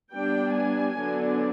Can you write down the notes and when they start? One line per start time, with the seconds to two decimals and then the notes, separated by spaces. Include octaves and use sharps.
0.12 G3 B3 D4 G5
0.54 G#5
0.96 D3 F#3 B3 D4